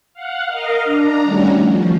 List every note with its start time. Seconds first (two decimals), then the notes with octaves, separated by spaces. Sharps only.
0.14 F5 F#5
0.47 A#4 D#5 F5
0.84 D4 A#5
1.23 D#3 G3 A3 C#4 F#4
1.60 F3